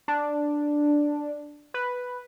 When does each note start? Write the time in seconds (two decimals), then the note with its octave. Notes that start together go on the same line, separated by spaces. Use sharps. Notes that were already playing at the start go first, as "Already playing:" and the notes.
0.08 D4
1.74 B4